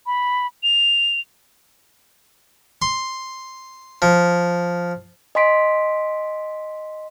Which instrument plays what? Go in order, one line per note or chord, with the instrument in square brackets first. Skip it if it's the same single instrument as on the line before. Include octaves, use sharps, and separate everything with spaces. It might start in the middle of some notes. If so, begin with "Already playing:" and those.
[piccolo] B5
F7
[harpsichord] C6
F3
[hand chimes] D#5 G#5 C6 B6 D7